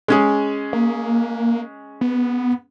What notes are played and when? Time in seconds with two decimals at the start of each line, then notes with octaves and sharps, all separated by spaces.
0.08 G#3 C#4 G#4
0.73 A#3
2.01 B3